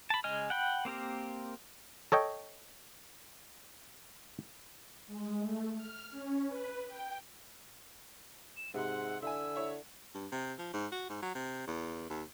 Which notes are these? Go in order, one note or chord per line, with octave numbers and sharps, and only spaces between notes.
A5 B5
C#3 G#3 D#5 G#5 F6
F#5 G5 B5
A#3 C4 G4 A#4
A4 C#5 D#5 G5
G#3
A3
F6
C#4
B4
G5
E7
G#2 C3 F#5 C6
D3 E4 G#5 E6
E4 C#5
G2
C3
F3
G#2
F#4
G#2
F#3
C3
E2
D#2